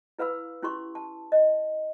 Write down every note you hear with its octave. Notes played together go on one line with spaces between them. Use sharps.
E4 B4 F5 B5 E6
C#4 E4 G4 C6 C#6
A5
D#5